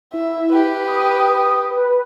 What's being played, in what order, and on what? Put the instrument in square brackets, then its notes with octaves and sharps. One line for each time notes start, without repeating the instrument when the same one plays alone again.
[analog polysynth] E4 [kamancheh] E5
[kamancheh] G4 B4
[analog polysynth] D#6
B4